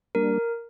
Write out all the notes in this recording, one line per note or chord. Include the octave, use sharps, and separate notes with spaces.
G3 A#3 D4 A#4